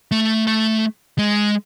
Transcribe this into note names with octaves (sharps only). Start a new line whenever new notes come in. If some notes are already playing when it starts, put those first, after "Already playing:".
A3
A3
G#3